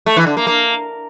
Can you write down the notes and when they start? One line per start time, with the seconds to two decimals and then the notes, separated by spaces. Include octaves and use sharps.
0.06 A3
0.17 E3
0.27 D3
0.37 A#3
0.47 A#3